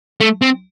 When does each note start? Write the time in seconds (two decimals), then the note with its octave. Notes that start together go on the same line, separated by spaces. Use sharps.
0.21 A3
0.42 C4